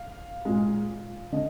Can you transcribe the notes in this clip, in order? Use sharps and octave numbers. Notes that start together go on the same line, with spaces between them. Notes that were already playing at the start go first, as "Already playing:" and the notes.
Already playing: F5
A#2 G#3
D3 D#5